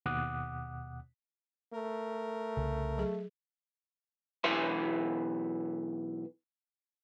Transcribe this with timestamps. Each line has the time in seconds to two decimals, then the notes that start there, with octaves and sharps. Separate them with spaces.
0.06 D#2 B2 F#5 D6 D#6 F#6
1.73 A3 A#4
2.57 C2 C#3
2.98 F#3 G#4
4.44 B1 E3 B4 E5 C6